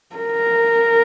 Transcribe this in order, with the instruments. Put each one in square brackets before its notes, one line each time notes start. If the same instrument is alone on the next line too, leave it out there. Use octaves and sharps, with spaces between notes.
[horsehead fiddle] A#4